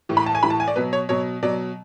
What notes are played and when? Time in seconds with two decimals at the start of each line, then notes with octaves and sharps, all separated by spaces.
0.09 A2 E3
0.17 B5
0.26 A5
0.35 G#5
0.43 A2 E3 B5
0.50 A5
0.60 G#5
0.68 D5
0.76 B2 F#3 B4
0.93 C#5
1.09 B2 F#3 C#5
1.43 B2 F#3 D5